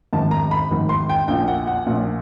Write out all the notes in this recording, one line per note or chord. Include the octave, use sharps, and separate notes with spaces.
G#1 G#2 D#3 A5
A#5
B5
G#1 G#2 D#3
C6
G5
A#1 A#2 G5
F#5
F#5
A#1 A#2